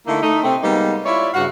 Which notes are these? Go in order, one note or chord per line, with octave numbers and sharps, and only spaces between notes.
D3 A3 A#3 D#4 E4
A3 D#4
C3 A3 C4
G3 G#3 A#3 B3 D#4
E4 F4 C#5 D5 E5
G2 C#3 F#4 F5 F#5